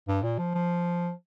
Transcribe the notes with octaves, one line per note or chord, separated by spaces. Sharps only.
G2
A#2
F3
F3